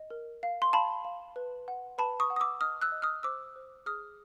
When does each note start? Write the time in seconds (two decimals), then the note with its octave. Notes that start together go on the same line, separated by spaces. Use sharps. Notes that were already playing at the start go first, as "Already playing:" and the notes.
Already playing: D#5
0.10 A#4
0.43 F5
0.62 C6
0.73 F5 A5 B5
1.05 F5
1.36 B4
1.68 F#5
1.98 B4 A5 B5
2.20 C#6 D#6
2.30 F#5
2.36 D#6
2.40 D6 E6
2.61 D#5 D#6 F6
2.82 E6 F#6
2.92 D#5
3.02 D#6 F6
3.23 C5 D6 E6
3.56 C5
3.86 G#4 D#6 F6